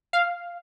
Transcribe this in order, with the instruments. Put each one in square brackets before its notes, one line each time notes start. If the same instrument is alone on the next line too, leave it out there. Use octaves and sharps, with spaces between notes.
[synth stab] F5